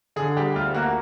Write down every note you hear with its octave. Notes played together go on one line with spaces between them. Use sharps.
D3 G#4
G3 G4
D2 F4
A#3 F#4